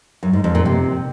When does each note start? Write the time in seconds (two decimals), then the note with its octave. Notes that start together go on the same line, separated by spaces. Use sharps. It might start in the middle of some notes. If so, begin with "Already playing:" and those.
0.23 F#2
0.33 G#2
0.44 F2
0.55 A#2
0.65 C3